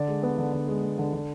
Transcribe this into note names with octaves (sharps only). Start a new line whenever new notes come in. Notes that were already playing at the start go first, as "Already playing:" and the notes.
Already playing: D3 D5
G#3
B3
D3
D3
G#3
B3
D3
D3